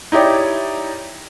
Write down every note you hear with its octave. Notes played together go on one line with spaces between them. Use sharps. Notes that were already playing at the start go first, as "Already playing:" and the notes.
D#4 E4 G4 C#5 D5